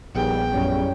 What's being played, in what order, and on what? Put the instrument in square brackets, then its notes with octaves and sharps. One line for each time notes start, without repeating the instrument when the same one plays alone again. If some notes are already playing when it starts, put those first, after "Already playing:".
[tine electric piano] A#1 B3 G#4 [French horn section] D#2 G3 [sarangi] G5
[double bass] F#2 C#4 [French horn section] A2 C#3 G3